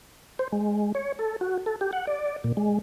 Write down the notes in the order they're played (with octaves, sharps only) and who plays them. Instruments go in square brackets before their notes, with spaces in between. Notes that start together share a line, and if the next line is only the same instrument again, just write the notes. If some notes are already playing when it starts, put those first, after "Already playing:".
[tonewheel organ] C5
G#3
C#5
A4
F#4
A4
G4
F#5
D5
A#2
G#3